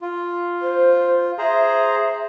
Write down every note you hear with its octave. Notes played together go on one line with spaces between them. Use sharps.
F4
C5
G#4 C5 E5 A#5